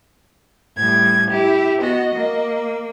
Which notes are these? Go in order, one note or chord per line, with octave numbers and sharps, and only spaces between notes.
A2 G3 G#6
E4 G4
B3 F#4 D#5
A#3